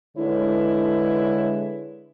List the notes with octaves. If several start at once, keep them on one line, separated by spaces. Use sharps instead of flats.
D3 G#3 E4 B4 C#5